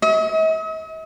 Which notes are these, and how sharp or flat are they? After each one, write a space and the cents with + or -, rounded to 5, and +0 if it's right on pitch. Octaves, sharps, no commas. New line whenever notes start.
D#5 +45